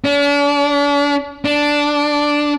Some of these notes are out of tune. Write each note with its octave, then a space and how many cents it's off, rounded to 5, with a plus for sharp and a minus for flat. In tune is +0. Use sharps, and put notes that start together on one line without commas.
D4 -45
D4 -5